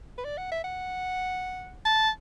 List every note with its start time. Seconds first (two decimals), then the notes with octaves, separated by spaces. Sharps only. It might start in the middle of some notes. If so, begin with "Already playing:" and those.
0.18 B4
0.25 D5
0.38 F#5
0.52 E5
0.64 F#5
1.85 A5